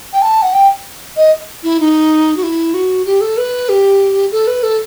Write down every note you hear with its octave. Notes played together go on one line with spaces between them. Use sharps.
G5
A5
F#5
G5
D#5
E4
D#4
F#4
E4
F#4
G4
A4
B4
G4
A4
B4
A4